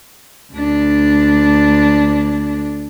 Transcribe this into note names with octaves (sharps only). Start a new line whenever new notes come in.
D2 D4